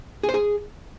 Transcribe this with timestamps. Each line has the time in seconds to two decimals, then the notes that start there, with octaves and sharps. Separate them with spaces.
0.23 G#4
0.29 C5
0.34 G#4